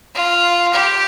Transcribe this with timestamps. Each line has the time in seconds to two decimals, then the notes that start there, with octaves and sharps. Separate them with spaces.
0.15 F4
0.74 G4